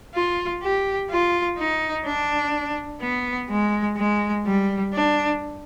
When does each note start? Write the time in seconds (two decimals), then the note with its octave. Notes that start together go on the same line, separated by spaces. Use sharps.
0.14 F4
0.63 G4
1.11 F4
1.58 D#4
2.05 D4
3.01 B3
3.50 G#3
3.97 G#3
4.46 G3
4.94 D4